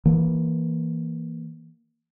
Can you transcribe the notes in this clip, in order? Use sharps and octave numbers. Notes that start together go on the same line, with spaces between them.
E3 A#3